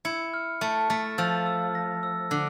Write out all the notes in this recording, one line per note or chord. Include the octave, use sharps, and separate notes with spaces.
E4 C#7
F6
A3 A5
A3 A6
F3 E6
E6
A#6
E6
D3 E6